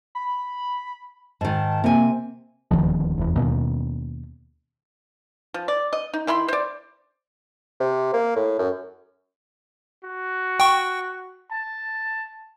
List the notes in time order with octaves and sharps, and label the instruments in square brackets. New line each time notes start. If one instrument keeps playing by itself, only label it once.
[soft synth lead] B5
[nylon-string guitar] G#2 D#3 [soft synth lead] A5
[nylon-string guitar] C3 G#5 [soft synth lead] A#3
[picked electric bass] D#1 D2 D#3 F3
F1 E2
D#2 B2
[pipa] F3
D5
D#5
D#4
D#3 E4 B5 C6
C5 D5
[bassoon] C3
A#3
A2
F#2
[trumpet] F#4
[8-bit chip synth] G5 C#6
[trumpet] A5